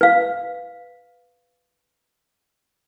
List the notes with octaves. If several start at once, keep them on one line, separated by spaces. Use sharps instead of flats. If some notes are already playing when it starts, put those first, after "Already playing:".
B4 F5